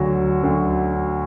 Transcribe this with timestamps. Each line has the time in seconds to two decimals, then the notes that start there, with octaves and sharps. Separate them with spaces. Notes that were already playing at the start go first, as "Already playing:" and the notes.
Already playing: D2 D3 F#3
0.43 D2 D3 F#3